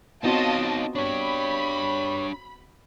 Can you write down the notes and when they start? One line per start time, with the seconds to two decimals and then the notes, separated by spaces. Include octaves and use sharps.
0.24 B3 C4 D#4 F4 F#4 C#5 D#5 A5
0.95 D4 G4 C#5 B5